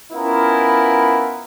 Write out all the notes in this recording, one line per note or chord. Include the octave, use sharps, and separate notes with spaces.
B3 C#4 E4 F4 A#4